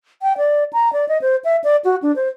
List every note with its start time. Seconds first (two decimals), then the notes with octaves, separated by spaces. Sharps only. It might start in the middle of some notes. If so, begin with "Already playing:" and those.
0.22 G5
0.37 D5
0.73 A#5
0.93 D5
1.09 D#5
1.22 C5
1.45 E5
1.64 D5
1.85 F#4
2.03 D4
2.16 C5